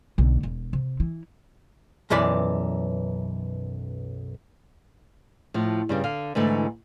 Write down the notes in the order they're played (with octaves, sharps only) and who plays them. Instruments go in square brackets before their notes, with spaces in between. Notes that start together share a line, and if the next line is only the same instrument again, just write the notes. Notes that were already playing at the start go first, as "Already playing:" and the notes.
[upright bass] B1 D3
E1
C3
E3
[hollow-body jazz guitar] B1 F#2 E3 D5 B5
[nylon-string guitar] A2 F3
G2 C#3 G3
D3 F5
G#2 D3 E3 A3